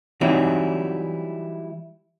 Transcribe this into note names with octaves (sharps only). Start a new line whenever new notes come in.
E3 F#3 G3 C4 D#4 E4